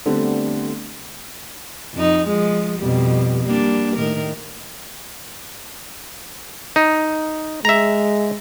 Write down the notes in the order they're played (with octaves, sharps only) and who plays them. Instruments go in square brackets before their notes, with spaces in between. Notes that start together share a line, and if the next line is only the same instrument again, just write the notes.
[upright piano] D3 G3 A3 B3 C4
[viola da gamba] F2 D#4
F3 G#3
F2 B2 G3
G3 A#3 D4
A2 D#3 A#4
[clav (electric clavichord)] D#4
[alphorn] G#3 [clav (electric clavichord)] E5 A#5